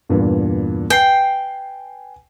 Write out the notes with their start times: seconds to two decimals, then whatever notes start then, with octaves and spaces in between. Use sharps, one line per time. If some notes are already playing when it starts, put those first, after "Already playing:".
0.09 E2 G2 A#2
0.90 B4 G5 G#5 C7